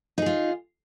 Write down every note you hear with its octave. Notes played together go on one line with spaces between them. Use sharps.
D#4 F4 G#4